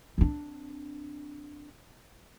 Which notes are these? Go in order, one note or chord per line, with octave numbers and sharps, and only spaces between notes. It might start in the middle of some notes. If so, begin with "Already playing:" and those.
C4 D4